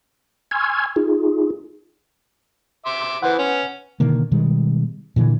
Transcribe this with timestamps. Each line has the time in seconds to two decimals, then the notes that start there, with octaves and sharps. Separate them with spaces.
0.51 G#5 C6 C#6 E6 F6 G#6
0.96 D#4 F4 G#4
2.86 E5 C6 D6
3.23 E3 B4 C5 F#5
3.38 C#4
4.00 B2 D3 D#3 A#3
4.32 B2 D#3 G3 G#3
5.16 A#2 D3 E3